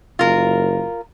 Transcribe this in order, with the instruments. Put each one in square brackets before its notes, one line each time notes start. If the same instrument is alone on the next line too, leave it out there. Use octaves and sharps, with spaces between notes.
[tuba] F#1 [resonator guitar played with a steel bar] F4 A#4